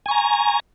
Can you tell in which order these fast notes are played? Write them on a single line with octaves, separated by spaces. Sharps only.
G#5 C#6 A#5